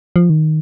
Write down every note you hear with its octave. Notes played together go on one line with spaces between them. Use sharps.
F3
D#3